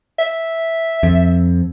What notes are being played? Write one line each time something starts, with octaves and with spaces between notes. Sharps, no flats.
E5
F2